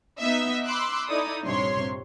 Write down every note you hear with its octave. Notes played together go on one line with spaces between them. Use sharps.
B3 D#4 D#5 E5
B5 C6 D6 E6 F#6
D#4 E4 A4 D5 D#6
A#1 G2 C3 C#5 C6